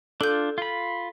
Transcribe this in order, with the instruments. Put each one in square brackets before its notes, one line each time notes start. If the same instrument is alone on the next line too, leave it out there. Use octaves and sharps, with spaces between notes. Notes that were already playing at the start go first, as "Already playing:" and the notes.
[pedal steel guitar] D4 F4 [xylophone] A4 G6
[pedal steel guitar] F4 B5